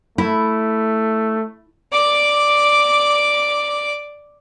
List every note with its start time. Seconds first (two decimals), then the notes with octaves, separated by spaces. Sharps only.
0.18 A3 E4
1.92 D5 D6